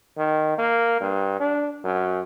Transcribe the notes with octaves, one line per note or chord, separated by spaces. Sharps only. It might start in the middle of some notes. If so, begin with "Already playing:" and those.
D#3
A#3
G2
D4
F#2